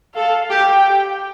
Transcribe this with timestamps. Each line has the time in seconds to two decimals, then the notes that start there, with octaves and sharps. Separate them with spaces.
0.15 A4 F5
0.50 G4 G5